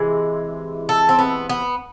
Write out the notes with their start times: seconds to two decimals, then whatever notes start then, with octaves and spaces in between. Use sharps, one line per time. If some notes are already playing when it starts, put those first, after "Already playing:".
Already playing: C3 E3 G#3
0.89 A4
1.09 C4
1.19 B3
1.50 B3